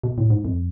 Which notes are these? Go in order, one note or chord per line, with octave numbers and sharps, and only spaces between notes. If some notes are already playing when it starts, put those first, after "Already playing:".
B2
A2
G#2
F2